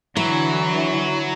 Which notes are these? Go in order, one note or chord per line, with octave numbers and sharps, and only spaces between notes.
D3 E3 F#3 E4